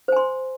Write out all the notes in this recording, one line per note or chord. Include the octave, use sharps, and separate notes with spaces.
C5 G#5 C6